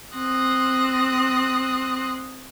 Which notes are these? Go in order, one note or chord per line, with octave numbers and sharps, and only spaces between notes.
C4 C6 D#6 F#6 A#6